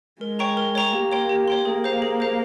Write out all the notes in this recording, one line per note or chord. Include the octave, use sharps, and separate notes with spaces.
G#3 A#4
C#5 G5 A#5 C#6
A#4
C#5 G5 A#5 C#6
A#3 G4
C#5 G5 C6
G4
C#5 G5 C6
A#3 G#4
C5 F5 A#5
G#4
C5 F5 A#5